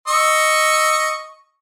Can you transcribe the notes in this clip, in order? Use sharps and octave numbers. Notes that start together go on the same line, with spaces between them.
D#5 C#6 E6